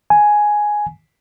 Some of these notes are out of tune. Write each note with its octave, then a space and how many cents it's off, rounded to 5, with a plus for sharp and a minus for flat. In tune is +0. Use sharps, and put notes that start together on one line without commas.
G#5 +5